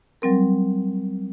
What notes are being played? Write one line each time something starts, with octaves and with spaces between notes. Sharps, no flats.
F#3 G3 C4 A#4